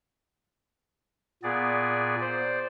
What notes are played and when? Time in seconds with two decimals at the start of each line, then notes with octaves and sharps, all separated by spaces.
1.43 A#2 B3 G#4 D5
2.20 C5 D5